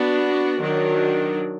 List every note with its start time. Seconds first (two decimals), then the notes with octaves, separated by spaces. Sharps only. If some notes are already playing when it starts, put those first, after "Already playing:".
Already playing: B3 D4 F#4
0.61 D#3 F#3 D4